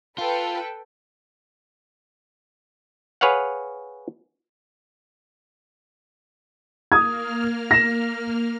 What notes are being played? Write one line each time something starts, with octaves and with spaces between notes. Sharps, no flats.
F4 A4 B4 G5
G#4 B4 C#5 F5 F#5
A#3 D#6 F6 G#6
A#6 E7